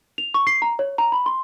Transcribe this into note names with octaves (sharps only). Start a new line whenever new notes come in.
F7
C#6
C7
A#5
C#5
A#5
B5
C6